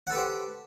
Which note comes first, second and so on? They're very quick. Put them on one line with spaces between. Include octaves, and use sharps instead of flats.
F#5 A4 B4 G4 C5